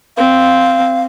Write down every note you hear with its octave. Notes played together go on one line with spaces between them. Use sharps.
C4 F5